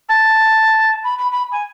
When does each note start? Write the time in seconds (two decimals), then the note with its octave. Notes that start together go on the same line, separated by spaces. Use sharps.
0.08 A5
1.04 B5
1.18 B5
1.32 B5
1.52 G#5